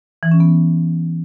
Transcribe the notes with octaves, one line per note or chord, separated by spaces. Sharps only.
E3
C#4
B3